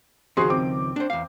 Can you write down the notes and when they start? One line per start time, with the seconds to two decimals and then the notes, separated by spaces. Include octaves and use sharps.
0.37 C#2 D#3 F3 F#4 G#4 C6
0.50 C4 D6
0.96 D4 C5
1.10 E2 F5